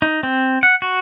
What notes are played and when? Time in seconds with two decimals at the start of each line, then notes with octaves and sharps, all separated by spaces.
0.02 D#4
0.23 C4
0.63 F#5
0.82 F#4